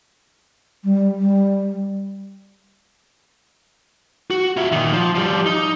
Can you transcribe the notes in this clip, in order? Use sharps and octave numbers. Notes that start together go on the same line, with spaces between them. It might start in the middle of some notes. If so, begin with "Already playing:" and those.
G3
G3
F#4
F4 E5
A#2 D#3
F3
F3 G3
D#4